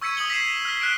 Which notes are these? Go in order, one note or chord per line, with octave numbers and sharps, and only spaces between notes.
C#6 E6 G#6 B6 C#7 D#7
D#6 G#6 F#7 G7
B6 C7 E7
F6 B6
F6 F#6 B6 D7 E7